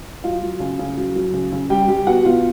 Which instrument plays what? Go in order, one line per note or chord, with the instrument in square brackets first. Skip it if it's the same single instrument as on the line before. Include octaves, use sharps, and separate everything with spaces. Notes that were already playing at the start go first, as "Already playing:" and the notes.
[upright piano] F#3 F4 F5
F#3
C#3
C#3
F#3
F#3
C#3
C#3
G3 G4 G5
G3 G4 G5
B2 F#4 F#5
B2 F4 F5